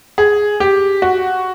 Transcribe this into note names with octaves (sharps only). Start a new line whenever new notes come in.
G#4
G4
F#4